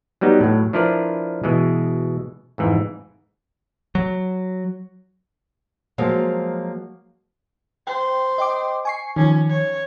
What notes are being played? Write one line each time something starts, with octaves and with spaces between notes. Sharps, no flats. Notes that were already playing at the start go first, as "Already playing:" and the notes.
F#3 G3 B3 D#4
A2 F#3
F3 D4 E4 A#4 B4 D5
B2 E3 G#3
F2 G#2 E3
F#3
F3 F#3 G#3 A#3
C5 G5
D#5 G5 D6
G#5 C#6 C7
D#3 F3 C#4
C#5